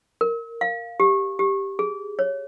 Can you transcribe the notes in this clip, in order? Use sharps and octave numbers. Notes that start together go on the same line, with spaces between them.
A#4
F5
G4
G4
G#4
C#5